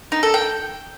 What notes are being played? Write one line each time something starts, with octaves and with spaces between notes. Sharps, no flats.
D#4
A4
G5